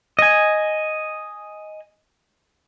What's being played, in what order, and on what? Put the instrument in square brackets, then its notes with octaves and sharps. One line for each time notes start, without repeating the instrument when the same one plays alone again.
[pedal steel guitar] D#5 G#5